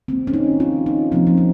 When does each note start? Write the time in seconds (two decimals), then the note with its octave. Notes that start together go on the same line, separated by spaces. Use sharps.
0.08 D#3 A#3 C4
0.27 C#4
0.34 D#4
0.60 F4
0.86 D#4
1.11 C3 F3 A#3 C4
1.27 C4
1.37 C#4